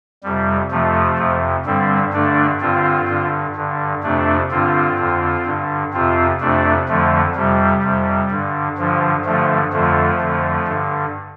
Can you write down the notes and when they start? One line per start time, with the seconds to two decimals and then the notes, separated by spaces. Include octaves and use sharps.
0.24 F2 C3 G3
0.71 F2 C3 F3 A3
1.18 F2 C3
1.66 G2 D3 G3 C4
2.13 G2 D3 A3 D4
2.61 G2 D3 C4 F4
3.09 G2 D3
3.56 G2 D3
4.03 F2 C3 A3 D4
4.51 G2 D3 C4 F4
4.98 F2 D3
5.46 G2 D3
5.93 F2 C3 C4 F4
6.40 F2 C3 A3 D4
6.88 F2 D3 F3 A3
7.35 F2 C3 G3
7.83 F2 C3
8.31 G2 D3
8.78 G2 D3 F3
9.25 G2 D3 F3 A3
9.73 F2 D3 F3 A3
10.21 F2 D3
10.68 G2 D3